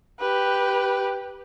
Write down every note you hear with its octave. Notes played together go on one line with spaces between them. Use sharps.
G4 B4